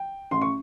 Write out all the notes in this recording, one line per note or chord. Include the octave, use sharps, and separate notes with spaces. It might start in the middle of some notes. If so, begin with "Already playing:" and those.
Already playing: G5
A1 C6
C#6